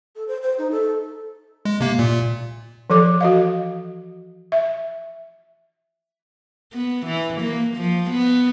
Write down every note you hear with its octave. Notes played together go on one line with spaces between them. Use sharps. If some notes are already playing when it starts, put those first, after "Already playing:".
A4
C5
C5
D#4
A4
G#3
C3 A#3
A#2
E3 F3 A4 D6
F#4 D#5 F5
E5
B3
E3
A#3
F3
B3